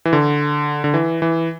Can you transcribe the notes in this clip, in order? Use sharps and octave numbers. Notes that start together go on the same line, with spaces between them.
E3
D3
D3
E3
E3